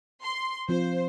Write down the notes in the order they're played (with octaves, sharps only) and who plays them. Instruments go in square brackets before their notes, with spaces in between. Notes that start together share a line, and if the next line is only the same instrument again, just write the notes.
[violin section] C6
[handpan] F3 C4 F4 [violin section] C5